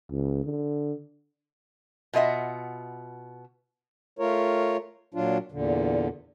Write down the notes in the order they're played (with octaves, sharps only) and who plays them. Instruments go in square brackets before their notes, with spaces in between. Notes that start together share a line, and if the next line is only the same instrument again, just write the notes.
[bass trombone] C#2
D3
[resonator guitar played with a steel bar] B2 F4 D#5 E5 F#5
[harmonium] A3 F4 A#4 C#5
A#2 F#3 D4 F4
E2 A#2 D3